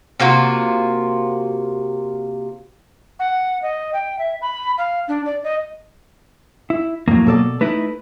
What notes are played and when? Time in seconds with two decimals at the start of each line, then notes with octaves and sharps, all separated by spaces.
0.20 C3 A#3 F4 F#4
3.19 F#5
3.62 D#5
3.93 G5
4.19 E5
4.42 B5
4.78 F5
5.08 D4
5.26 D5
5.44 D#5
6.70 E4
7.08 F2 A2 F#3 A#3
7.27 B2 A4 D5
7.61 A3 D#4 E4 B4